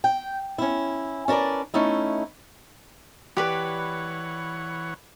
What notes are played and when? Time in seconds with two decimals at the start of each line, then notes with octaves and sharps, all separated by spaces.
0.04 G5
0.58 C#4 E4
1.28 C#4 D4 A#4 B4 D5
1.74 A3 C#4 D#4 E4
3.37 E3 G4 B4 C#5 D5 F#5 B5